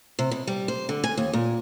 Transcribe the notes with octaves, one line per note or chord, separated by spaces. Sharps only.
C3
B2
G3
C5
D3
G#5
D#2
A#2